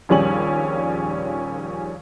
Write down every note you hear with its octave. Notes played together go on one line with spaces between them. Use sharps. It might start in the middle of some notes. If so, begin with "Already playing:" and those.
A#1 D#2 G3 C#4 G#4 F#7